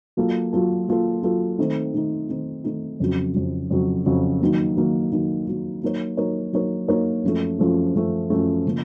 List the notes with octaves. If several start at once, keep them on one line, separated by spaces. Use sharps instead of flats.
F#3 A#3 F4 A4
F#3 A#3 F4 A4
F#3 A#3 F4 A4
F#3 A#3 F4 A4
D#3 A3 C4 D#4
D#3 A3 C4 D#4
D#3 A3 C4 D#4
D#3 A3 C4 D#4
F2 C#3 F#3
F2 C#3 F#3
F2 C#3 F#3
F2 C#3 F#3
D#3 F#3 A#3
D#3 F#3 A#3
D#3 F#3 A#3
D#3 F#3 A#3
F#3 A#3 D#4 A#4 C#5
F#3 A#3 D#4 A#4 C#5
F#3 A#3 D#4 A#4 C#5
F#3 A#3 D#4 A#4 C#5
F#2 F3 A3
F#2 F3 A3
F#2 F3 A3
F#2 F3 A3
C#3 F3 A#3